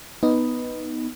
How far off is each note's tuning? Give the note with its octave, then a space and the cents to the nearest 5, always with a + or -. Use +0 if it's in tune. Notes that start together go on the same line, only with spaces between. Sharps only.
B3 +0 D#4 +0